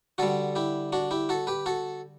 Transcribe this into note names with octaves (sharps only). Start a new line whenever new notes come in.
D3 G3 F#4 A4
E4 G4
D4 F#4
E4 G4
F#4 A4
G4 B4
F#4 A4